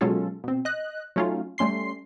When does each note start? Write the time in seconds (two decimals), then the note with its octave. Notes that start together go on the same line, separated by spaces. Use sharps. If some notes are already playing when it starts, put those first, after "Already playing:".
0.01 B2 F#3 G#3 C#4 F4 A4
0.44 B2 C4
0.65 D#5 F#6
1.16 F#3 A3 C#4 D#4 F4
1.58 G3 A3 C#4 C6 C7